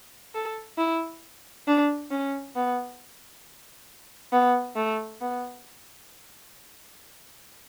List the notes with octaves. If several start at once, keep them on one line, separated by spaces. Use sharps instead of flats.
A4
E4
D4
C#4
B3
B3
A3
B3